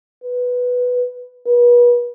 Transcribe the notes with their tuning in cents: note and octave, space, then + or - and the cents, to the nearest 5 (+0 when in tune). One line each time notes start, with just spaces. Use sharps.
B4 +0
B4 -35